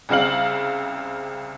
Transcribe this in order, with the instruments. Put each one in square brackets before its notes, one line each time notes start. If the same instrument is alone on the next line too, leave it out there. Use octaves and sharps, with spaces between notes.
[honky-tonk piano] C2 C#3 C4 F5 F#7